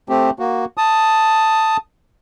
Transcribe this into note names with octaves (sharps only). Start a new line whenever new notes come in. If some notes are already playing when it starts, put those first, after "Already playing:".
A3 C4 G4
A#3 F#4
A5 D#6